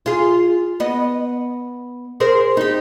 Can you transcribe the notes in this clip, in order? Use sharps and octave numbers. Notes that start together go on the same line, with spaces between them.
F4 G#4
B3 D#5
G#4 A#4 C5
D#4 G4